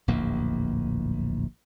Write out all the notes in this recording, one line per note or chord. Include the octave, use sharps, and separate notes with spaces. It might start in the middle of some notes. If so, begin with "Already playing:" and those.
D1 A#1 E2 A#3